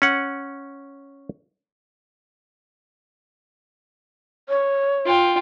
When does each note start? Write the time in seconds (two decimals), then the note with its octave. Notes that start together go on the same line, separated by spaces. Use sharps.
0.02 C#4 F#5
4.49 C#5
5.06 F4 G5